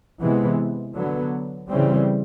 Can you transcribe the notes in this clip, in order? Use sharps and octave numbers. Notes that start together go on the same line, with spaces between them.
C3 E3 G#3 B3
D3 F#3 B3
C#3 E3 G3 C4